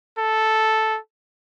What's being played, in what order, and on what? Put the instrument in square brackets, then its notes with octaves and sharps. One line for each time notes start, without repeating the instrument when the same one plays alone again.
[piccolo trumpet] A4